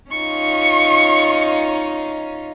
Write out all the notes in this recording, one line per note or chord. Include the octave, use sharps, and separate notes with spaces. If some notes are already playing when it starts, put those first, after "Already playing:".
C#4 D#4 F4 C#6